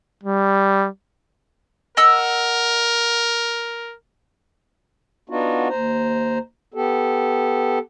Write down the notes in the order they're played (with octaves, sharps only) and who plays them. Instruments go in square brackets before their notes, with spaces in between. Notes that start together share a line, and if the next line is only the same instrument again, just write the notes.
[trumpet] G3
[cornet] A#4 [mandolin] D#5 F#5 E6
[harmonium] B3 D4 D#4 F4 F#4
D#2 C5 A#5
B3 G4 A4